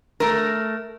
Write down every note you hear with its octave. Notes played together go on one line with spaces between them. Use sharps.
A3 A#4